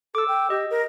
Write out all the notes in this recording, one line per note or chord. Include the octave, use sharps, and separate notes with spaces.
A4 D6 E6
G5
G4 D#5
A#4